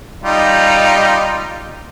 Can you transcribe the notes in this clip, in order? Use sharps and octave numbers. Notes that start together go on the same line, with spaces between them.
G3 D#4 F4